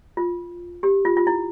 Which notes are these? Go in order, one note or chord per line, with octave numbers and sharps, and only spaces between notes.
F4
G4
F4
F4
E4